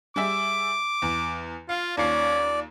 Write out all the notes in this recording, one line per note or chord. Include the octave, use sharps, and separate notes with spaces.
G3 G#4 E5 D6
E2
F4 F5
D#2 C#4 F4 D5 C7